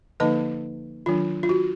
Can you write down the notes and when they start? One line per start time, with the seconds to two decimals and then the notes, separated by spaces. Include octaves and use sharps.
0.20 D3 F3 A#3 D#4 B4 D#5
1.06 D#3 F#3 D4 F4
1.43 F4
1.49 F#4